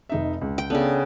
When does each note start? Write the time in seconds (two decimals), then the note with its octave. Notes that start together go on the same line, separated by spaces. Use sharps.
0.09 F1 D#4 E5
0.41 C#2
0.58 G5
0.70 C#3 B3 D4 A4